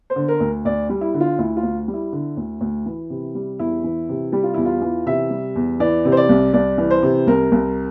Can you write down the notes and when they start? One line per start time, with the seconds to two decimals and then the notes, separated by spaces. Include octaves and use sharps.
0.10 C5
0.16 D3
0.28 A#4
0.40 D2
0.65 D2 D5
0.90 G3
1.01 E4
1.14 D3
1.20 F4
1.39 D2 E4
1.57 F4
1.63 D2
1.88 G3
1.94 E4
2.13 D3
2.37 D2
2.61 D2
2.86 E3
3.10 C3
3.35 G3
3.59 E2 E4
3.84 E3
4.09 C3
4.32 G3 G4
4.44 F4
4.54 E2 E4
4.65 F4
4.82 E3
5.06 C3 E5
5.30 G3
5.56 E2
5.80 E3 D5
6.05 C3
6.12 C5
6.17 D5
6.29 C2
6.54 C2 D5
6.78 E3
6.90 C5
7.03 C3
7.27 C2 A#4
7.52 C2